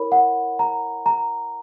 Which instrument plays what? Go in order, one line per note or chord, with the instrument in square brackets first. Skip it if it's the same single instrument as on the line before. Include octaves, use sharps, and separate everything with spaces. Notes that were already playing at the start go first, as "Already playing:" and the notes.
Already playing: [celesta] E4 A#4 C#5 B5
F#5
A#5
A#5